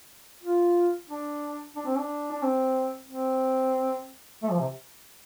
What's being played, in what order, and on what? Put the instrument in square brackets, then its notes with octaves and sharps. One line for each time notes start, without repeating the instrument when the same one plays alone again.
[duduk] F4
D4
D4
C4
D4
D4
C4
C4
A3
F3
C3